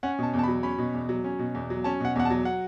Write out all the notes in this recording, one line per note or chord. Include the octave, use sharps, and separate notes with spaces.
C#4 F#5
B2 A5
E2
A5
B5
F#3
C#4 B5
B2
E2
F#3
C#4
B2
E2
F#3
C#4 A5
B2 F#5
E2 F#5
A5
F#3
F#5